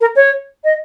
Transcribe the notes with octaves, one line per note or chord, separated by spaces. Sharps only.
A#4
C#5
D#5